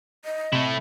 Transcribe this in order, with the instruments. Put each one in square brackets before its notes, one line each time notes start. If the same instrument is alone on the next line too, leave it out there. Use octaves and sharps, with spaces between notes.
[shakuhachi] D#5
[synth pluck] C3 [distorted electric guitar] A3 E4